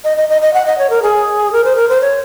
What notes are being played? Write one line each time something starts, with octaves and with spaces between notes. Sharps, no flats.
D#5
D#5
D#5
D#5
F#5
D#5
C#5
A#4
G#4
A#4
C5
A#4
C5
C#5